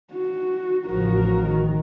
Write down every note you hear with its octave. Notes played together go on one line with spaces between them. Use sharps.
F#4
A1 C#3 F3 F#4 A#4
D#3